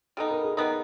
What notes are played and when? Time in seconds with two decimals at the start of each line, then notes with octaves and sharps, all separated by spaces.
0.17 G3 B3 D#4 A4
0.31 A#4
0.44 G#4
0.57 G3 B3 D#4 A#4